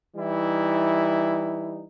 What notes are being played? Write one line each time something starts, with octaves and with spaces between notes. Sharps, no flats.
E3 G3 D#4 E4